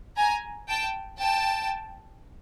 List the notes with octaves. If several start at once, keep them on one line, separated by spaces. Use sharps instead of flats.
G#5 A#5
G5 A5
G5 A5